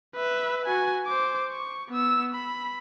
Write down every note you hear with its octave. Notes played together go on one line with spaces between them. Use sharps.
B4 E5
F#4 G#5
C5 D6
C#6
B3 E6
B5